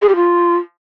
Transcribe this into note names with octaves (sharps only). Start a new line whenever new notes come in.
G#4
G4
F4